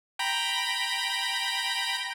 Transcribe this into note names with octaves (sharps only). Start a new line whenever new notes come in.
G5 A#5 B5